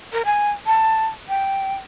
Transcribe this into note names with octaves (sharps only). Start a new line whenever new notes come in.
A#4
G#5
A5
G5